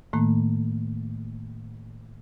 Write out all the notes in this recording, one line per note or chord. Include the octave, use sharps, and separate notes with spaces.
A2 D#3 A3 A#3